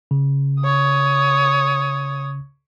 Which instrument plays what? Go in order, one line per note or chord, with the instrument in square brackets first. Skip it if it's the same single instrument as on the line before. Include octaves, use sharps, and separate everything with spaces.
[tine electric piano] C#3
[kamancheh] C#5 D#6